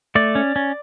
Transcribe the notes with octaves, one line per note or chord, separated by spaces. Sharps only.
A3 D5
C#4
C#4